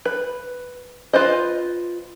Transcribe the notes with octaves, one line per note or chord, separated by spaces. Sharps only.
B4
F4 B4 C5 D#5